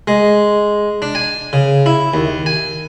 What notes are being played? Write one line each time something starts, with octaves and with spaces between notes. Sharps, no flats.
G#3
D4
G#5
C#3
E4
D#2
G#5